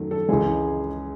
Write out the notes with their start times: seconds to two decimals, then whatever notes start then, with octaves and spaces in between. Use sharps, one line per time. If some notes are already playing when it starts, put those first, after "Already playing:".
Already playing: F#2 D#3 F#3 A3
0.11 A4
0.29 C#2 C#3 E3 G#3 G#4